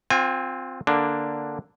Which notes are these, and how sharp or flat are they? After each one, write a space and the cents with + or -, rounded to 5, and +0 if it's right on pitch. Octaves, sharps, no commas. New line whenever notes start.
C4 +0 F4 +30 G#5 -30
D3 +0 A#3 +0 D4 +0